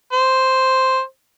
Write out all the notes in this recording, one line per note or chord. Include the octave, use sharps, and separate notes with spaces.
C5